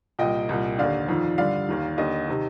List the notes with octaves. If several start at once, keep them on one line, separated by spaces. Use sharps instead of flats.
C2 A#2 D#5 G5
C2 A#2
D#2 D3 D5 F5
F2 D#3
G2 D3 D5 F5
D#2 D#3
D#2 D3 D#5
C3 D#3